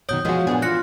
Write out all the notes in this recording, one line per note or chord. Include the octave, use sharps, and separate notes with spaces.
F#2 B2 D#3 C#5 D#6 G6
F3 G#3 B3 F4 F#4
F#2 A#2 B3 D4 G#4
E3 F4 F#6 A#6 C#7